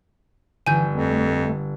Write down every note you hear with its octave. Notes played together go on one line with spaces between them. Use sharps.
G1 E3 G#5 G6
F2 A3